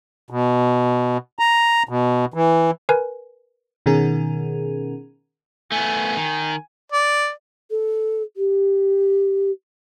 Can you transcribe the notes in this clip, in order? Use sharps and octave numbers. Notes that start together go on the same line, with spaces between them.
B2
A#5
B2
E3
A#4 B4 G#5
B2 D#3 C#4 G#4 A#4
A3 B3 G#5
D#3
D5
A4
G4